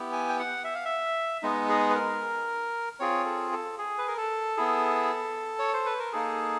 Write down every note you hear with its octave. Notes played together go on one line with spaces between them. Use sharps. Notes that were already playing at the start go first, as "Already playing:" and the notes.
Already playing: B3 E4 G4
G#5
G5
F#5
E5
F5
E5
G#3 B3 D#4
G#4
B4
A#4
C4 F4 G#4 C#5
A4
A4
G#4
B4
A#4
A4
B3 E4 G#4
C#5
C5
B4
A#4
A#3 D#4 G#4 A4